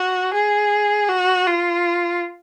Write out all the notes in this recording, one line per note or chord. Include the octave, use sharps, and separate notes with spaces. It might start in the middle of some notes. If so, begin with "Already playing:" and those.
Already playing: F#4
G#4
F#4
F4